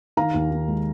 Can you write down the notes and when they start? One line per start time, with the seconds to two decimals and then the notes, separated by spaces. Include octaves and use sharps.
0.17 D#3 F5 A#5
0.34 D#2
0.51 D#3
0.68 G#3